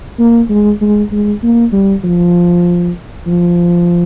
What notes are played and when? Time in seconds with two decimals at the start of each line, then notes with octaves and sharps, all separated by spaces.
0.19 A#3
0.50 G#3
0.81 G#3
1.12 G#3
1.43 A#3
1.73 G3
2.04 F3
3.27 F3